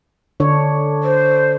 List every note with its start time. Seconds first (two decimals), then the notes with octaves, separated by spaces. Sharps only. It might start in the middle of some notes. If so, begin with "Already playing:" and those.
0.40 D3 D4 C#5
1.03 C5